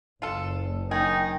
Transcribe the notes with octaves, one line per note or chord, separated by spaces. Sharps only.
F#1 F4 A4
D#3 D#4 G#4 G5